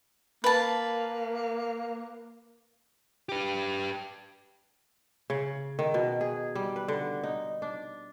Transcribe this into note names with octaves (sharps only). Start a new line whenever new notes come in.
A#3 B4 A5
G4 B4
C#3
D#3
B2
G#4
G3
B4
D3
D#4
D4